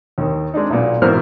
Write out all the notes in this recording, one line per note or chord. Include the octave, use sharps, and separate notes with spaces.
D#2 D#3
G#3 C4 D4 D#4
B1 A#2
G#2 B2 E3 A#4 C5 F6